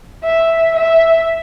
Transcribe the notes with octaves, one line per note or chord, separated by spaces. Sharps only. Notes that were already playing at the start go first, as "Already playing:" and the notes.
E5
E5